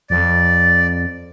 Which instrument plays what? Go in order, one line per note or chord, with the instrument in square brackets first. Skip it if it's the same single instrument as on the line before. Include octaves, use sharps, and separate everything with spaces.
[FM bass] F2 [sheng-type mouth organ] D5